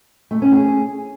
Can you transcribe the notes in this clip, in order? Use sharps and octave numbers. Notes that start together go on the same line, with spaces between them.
A3
C#4
G#4